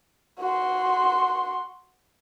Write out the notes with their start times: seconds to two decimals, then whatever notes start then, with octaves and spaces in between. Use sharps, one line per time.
0.40 F#4 C6